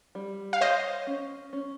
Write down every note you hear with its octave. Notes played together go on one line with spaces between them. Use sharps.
G3
F5
C5 C#5 D#5
C#4
C#4